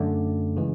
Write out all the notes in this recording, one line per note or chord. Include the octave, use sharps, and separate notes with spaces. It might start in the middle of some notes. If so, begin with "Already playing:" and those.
Already playing: F#2 D3 A3 D5
C#3 E3 G#3